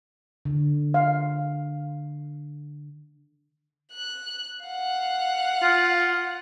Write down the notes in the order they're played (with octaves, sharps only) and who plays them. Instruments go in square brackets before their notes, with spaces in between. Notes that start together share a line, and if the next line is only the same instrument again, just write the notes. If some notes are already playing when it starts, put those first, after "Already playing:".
[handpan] D3
[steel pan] F5
[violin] F#6
F5 F#5
[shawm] F4